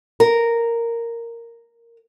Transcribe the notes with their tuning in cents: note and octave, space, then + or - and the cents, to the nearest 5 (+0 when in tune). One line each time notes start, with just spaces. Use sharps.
A#4 -5